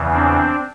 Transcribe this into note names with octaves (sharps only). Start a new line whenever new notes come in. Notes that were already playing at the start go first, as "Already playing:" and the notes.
Already playing: E2 C#3 E3
C4 D4